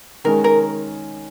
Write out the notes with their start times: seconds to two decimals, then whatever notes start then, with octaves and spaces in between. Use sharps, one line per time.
0.24 D#3 G#3 C#4 A#4
0.44 A#4